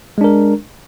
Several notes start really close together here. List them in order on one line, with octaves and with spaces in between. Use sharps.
G#3 D4 A#4